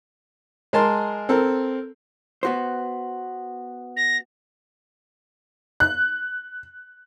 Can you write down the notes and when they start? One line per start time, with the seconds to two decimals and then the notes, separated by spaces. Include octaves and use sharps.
0.73 G#3 A#4 A5 C6
1.29 C4 A4 A#4
2.43 B3 F#4 C5
3.97 A#6
5.80 F#6